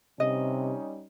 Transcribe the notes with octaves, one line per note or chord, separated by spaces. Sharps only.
C3 G3 C#4 D#4 D#5